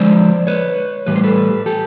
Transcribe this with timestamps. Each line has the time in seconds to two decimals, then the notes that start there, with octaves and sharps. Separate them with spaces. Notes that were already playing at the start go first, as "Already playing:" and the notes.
Already playing: D3 F3 G#3 C5 D5
0.47 B4 C#5
1.06 A2 E3 G3 B4
1.16 C5
1.23 A4 B4
1.66 G4 A4